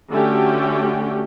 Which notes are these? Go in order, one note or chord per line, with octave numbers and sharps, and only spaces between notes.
D3 A3 C#4 F#4 G4 G5